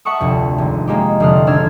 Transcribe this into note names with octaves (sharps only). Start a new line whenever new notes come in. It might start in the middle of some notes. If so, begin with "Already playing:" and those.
E5 F#5 A5 C#6 D#6
F1 D2
G#1
G#3 A#3 D#4 G4
F1 D3 F4 D#6 F6 F#6
G#1 D4 E6 F6 G#6